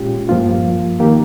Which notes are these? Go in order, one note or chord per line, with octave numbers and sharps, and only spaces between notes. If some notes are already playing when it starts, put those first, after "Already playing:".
Already playing: A#2 G#3 C#4 F4 G4
G2 F3 A#3 F4
D#3 A#3 G4